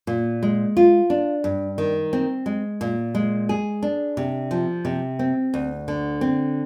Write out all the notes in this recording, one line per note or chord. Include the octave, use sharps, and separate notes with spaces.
A#2
G#3
F4
D4
G2
D#3
C4
G#3
A#2
G#3
G#4
D4
C3
F3
C3
C4
D2
D3
C4